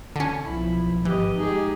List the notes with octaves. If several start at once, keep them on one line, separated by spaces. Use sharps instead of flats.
D3 C#4
B1 F3 E4
G#1 E3 G4 D#5
G#3 D#4 G4 G#4